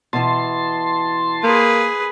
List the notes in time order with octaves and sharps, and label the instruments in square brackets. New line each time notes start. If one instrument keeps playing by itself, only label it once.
[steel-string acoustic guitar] B2 E3 [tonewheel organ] A5 C6
[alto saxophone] A#3 [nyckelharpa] G#4 B4